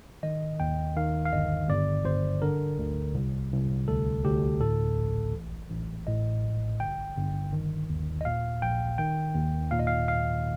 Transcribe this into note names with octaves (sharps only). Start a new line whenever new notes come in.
D#3 D#5
D#2 G5
D#3 F5
F5
G1 D#5
G1 D5
G1 C5
D3 A#4
D2
C2
C2
D2 A4
D2 G4
A2 A4
A#1
A1
A1
A2 D#5
A#1
G1 G5
G1
D#3
D#2
D#5
A#2 F5
A#1 G5
D#3 G5
D#2
A#2 F5
D#5
F5
F5